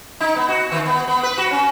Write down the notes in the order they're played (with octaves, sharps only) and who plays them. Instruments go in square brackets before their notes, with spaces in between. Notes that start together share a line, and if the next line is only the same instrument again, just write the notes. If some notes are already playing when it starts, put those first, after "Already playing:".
[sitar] D#4
B3
F#4
D#3
B3
B3
B4
F#4
C#4